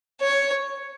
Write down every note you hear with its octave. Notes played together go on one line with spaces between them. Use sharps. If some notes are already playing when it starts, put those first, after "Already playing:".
C#5